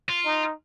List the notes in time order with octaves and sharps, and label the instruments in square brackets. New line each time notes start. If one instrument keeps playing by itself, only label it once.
[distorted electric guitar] F4
[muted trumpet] D#4